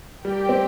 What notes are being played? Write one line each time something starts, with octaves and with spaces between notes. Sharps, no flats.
G3 G4 A#4 G5
C4